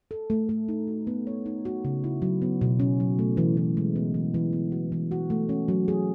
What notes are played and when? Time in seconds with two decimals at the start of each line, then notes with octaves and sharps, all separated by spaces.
0.11 A4
0.30 A3
0.49 A3
0.68 D#4
0.87 F#4
1.07 B3
1.27 C#5
1.46 D#4
1.65 F#4
1.85 C#3
2.04 E4
2.22 F#3
2.42 B3
2.61 B2
2.80 C#4
3.00 F#3
3.19 A3
3.37 E3
3.57 E3
3.77 G#3
3.96 B3
4.14 E3
4.34 E3
4.53 B3
4.72 F#4
4.92 E3
5.11 F#4
5.30 A3
5.49 C#4
5.68 F#3
5.88 G#4